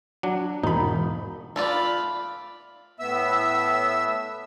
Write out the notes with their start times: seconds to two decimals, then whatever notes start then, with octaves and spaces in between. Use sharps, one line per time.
0.23 F#3 D4
0.64 E1 G#2 D#4 B5
1.56 A3 F4 D5 F5 B5
2.99 A2 B3 E5 E6